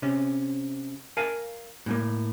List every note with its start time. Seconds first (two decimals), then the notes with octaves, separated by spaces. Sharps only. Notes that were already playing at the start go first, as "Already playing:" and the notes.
0.02 C3 C#4
1.17 A#4 F5 G#5 A5
1.86 A2 G#3 A#3